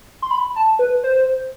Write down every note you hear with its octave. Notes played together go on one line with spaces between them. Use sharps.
C6
B5
A5
B4
C5